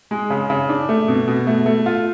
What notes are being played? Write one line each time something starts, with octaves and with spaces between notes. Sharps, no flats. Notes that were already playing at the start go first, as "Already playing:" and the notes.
G#3
C#3
C#3
D4
A3
B2
B2
A3
A3
F4